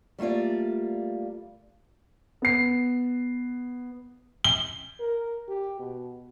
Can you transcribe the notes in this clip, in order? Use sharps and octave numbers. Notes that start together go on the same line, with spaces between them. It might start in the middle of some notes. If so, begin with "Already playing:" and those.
G3 A3 A#3 F4 D5
B3 C7
G7
A#4
G4
B2